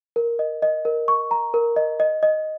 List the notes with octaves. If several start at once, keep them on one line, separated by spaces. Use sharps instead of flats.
A#4
D#5
D#5
A#4
C#6
A#5
A#4
D#5
D#5
D#5